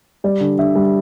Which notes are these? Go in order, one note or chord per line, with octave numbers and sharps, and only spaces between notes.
G3 D5
D3
D3 E5
G3